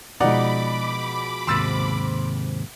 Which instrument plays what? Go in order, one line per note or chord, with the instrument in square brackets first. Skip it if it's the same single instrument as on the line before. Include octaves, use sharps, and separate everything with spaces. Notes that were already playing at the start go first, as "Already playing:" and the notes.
[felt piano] B2 F3 G#3 [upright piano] D#4 D5 F#5 [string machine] B5 D6
[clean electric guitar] D#2 G#2 C3 [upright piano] C6 E6 A6